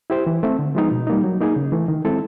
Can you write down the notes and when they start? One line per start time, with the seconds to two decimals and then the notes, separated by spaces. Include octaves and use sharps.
0.10 E4 G4 C5
0.27 E3
0.43 A3 C4
0.59 D3
0.75 F3 G#3 B3 D#4
0.91 B2
1.07 G3 A#3 D#4
1.24 F#3
1.40 A#3 D#4 G#4
1.56 C#3
1.72 E3 A3
1.88 D#3
2.05 G#3 C4 E4 A4